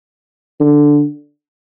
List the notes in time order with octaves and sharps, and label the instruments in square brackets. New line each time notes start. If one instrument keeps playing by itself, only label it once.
[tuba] D3